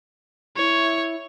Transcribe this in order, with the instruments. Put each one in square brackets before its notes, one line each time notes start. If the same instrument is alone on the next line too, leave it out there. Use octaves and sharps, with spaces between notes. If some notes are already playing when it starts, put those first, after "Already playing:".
[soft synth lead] E4 [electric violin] C#5